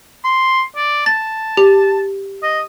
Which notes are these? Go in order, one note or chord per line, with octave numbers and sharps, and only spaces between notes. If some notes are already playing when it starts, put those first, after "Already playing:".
C6
D5
A5 A6
G4
D#5